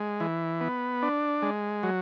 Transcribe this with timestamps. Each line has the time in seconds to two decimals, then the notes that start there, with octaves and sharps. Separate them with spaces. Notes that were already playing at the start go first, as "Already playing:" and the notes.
Already playing: G#3
0.20 E3
0.61 B3
1.02 D4
1.42 G#3
1.83 F#3